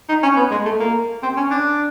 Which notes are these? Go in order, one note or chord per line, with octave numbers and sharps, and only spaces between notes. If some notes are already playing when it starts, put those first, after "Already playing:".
D#4
C#4
B3
G#3
A3
A#3
C4
C#4
D4